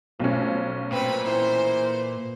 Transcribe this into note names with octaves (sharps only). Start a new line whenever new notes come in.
B1 F3 A3 C#4
A#2 C4 B4 B5
E3 C5